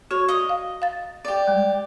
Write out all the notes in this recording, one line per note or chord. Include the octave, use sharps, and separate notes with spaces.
F#4 C#5
D#5
F5
F5 A6
G4 D5
G3 G#3